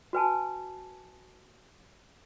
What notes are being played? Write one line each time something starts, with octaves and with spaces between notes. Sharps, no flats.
F#4 B4 G#5 A5